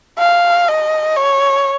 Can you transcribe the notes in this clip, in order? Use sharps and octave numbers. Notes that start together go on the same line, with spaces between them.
F5
D#5
C#5